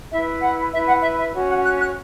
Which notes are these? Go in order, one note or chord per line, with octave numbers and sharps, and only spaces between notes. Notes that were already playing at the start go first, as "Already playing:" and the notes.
E4 B4 E5
F#5
E4 B4 E5
F#5
E5
E5
C#4 F#4 C#5
F#5
F#6
F#6